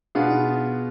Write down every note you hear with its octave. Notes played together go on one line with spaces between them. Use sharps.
B2 B3 D4 F4 G#4
D#4